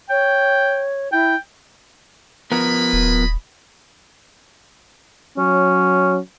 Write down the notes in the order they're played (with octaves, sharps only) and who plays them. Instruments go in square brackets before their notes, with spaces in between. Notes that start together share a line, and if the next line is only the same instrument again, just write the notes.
[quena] C#5 [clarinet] G5
[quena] E4 [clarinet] G5
[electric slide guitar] F3 B3 A#4 [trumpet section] D#5 G#5 B5
[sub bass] D#1
[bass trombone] F#3 [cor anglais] C#4